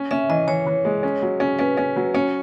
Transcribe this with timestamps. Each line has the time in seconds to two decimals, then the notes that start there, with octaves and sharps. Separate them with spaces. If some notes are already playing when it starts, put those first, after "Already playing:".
Already playing: C#4
0.11 C#4 E5
0.29 E3 D#5
0.47 E3 C#5
0.67 E3
0.85 G#3
1.03 C#4
1.22 F#3
1.40 C#4
1.59 C#4 B4
1.77 C#4
1.96 F#3
2.14 C#4 C#5